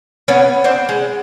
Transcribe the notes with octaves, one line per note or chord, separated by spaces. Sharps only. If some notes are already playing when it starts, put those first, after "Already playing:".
B3 C#4
C4 D4
G#3